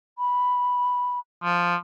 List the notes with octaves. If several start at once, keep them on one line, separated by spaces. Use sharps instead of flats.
B5
F3